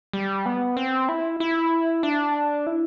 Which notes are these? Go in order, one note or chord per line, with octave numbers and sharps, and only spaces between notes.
G3
B3
C4
E4
E4
D4
E4